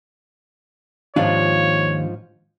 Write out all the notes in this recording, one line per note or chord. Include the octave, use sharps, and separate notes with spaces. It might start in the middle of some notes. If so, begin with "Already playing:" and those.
D#2 G#2 F3 D4 F4 C#5